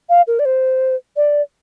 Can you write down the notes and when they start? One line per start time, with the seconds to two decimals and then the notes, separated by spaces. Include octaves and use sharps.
0.09 F5
0.27 A#4
0.39 D5
0.45 C5
1.17 D5